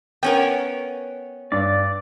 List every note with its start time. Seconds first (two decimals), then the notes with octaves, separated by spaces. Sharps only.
0.23 B3 C#4 A#4 G5
1.52 G2 D5